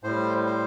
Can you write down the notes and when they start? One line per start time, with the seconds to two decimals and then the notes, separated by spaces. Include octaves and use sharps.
0.03 A2 G3 C5
0.46 C5